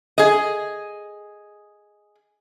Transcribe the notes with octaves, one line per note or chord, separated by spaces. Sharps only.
G#4 D#5